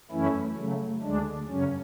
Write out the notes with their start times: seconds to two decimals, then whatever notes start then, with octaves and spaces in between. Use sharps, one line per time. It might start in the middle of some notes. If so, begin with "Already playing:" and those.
0.11 F#2 E3 A3 C#4 E4
0.57 C#3 F#3 A3
1.02 D2 D3 G#3 D4
1.49 F#2 C#3 F#3 C#4